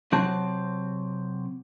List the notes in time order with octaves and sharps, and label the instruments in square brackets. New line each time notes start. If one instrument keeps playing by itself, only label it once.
[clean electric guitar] C3 F#3 C4 A5